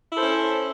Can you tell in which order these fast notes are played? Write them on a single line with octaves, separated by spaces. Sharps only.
E4 A4 C5 C#4